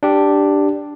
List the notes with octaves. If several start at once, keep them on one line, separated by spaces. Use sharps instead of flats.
D4 G4